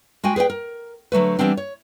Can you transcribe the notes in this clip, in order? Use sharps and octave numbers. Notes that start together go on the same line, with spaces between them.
G#3 F#4 G5 G#5
G#4 B4 D5 G5
A#4
D3 F#3 A3 B4
E3 G3 G#3 B3 C4 D4
C#5